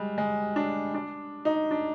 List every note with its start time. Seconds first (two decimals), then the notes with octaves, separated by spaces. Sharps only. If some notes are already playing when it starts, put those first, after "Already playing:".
Already playing: G3 G#3
0.18 G#3
0.56 D4
0.94 D4
1.45 D#4
1.71 D4